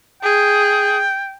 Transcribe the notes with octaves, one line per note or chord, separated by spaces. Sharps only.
G#4 G5